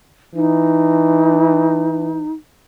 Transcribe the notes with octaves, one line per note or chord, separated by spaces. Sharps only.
E3 D#4